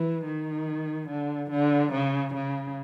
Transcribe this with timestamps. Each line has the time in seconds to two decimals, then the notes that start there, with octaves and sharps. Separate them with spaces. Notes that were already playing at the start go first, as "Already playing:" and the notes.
Already playing: E3
0.25 D#3
1.09 D3
1.51 D3
1.92 C#3
2.34 C#3